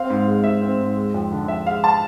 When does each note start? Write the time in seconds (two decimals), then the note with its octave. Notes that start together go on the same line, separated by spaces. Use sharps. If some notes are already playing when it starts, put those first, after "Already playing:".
Already playing: C4 F5
0.10 G#2
0.27 G#3
0.44 G#2 E5
0.62 C4
0.79 G#2
0.97 G#3
1.14 F2
1.32 D3
1.48 F2 E5
1.66 G#3 F5
1.84 A5